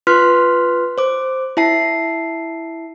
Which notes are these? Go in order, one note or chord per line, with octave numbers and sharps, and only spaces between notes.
F4 B4 C6 F6 F#6 B6
C5 D6
E4 E5 A5 C7